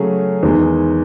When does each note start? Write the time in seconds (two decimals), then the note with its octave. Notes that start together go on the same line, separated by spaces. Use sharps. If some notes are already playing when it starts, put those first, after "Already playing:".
Already playing: C#3 F#3 A3 C#4 G#4
0.43 E2 D#3 G#3